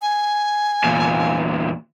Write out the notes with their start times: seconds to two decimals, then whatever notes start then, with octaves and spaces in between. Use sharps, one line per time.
0.02 G#5
0.84 E2 A#2